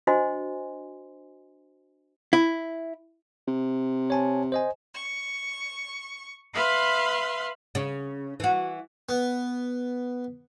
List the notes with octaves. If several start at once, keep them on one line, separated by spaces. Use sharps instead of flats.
D4 F#4 C5 D#5 G#5 C6
E4
C3
C#5 G#5 A5
C5 D#5 G#5
C#6
B4 E5 F5 B5 C6
C#3
E3 F#4
B3